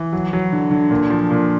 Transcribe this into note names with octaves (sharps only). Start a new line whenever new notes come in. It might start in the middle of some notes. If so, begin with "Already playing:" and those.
Already playing: E3
F#3
F#3
D3
D3
A#2
F3
A#2